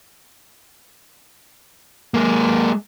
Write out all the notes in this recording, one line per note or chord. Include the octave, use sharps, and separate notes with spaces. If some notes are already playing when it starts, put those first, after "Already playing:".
G#3 A#3